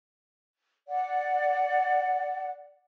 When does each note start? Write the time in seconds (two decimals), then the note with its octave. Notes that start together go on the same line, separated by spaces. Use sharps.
0.88 D5 F#5